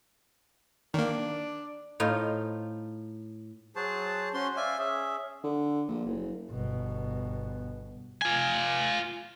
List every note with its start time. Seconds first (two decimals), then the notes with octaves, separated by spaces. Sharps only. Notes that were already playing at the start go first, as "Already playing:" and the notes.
0.94 D#3 A#3 D4
2.00 A2 D#4 F4 C5
3.76 F#3 F#4 G#4 C5 A5
4.34 C#4 F#4 C5 C6
4.56 D5 E5 F5 G#5
4.78 C#4 G#4 E5
5.44 D3
5.88 A#1
6.06 F#1
6.51 G1 B2
8.22 F4 G#5